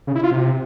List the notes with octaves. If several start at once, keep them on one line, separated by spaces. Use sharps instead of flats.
C#3
E4
F4
C3